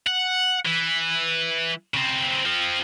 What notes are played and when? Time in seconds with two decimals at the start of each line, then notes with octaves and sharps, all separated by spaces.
0.07 F#5
0.65 E3
1.94 C#3 C4
2.46 F3 C4